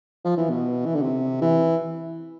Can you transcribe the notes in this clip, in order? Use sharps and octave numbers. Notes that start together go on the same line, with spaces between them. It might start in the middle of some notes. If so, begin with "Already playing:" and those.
F3
E3
B2
E3
D3
C3
E3